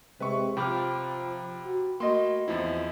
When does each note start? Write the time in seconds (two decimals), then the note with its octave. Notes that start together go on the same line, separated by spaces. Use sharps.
0.20 C3 G#3 C4 B4 E5 C#6
0.57 C3 F3 F4 G5 B5 D6 F6
1.65 F#4
2.00 A3 A#3 F#4 D#5 C6
2.48 E2 F3 C4 E4